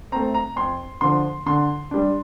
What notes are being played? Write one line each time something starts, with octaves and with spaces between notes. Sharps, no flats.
A3 C4 A#5
A#5
F2 C6
D3 F3 C6
D3 C6
G3 D4